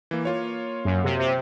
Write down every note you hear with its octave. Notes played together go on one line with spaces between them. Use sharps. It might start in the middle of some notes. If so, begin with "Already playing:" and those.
E3 A#3
A#3 F4 C#5
F#2
C3
C3